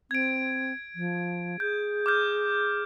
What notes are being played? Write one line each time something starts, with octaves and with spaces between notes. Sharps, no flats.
C4 G#6 D7
F3
G#4 G6
D6 F6 G6